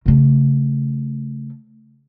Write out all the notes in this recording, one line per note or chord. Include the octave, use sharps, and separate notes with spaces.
C#3 A3